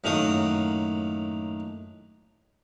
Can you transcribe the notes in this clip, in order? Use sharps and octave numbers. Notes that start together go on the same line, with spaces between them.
F#2 A2 D#3 A#3 F#4 D#6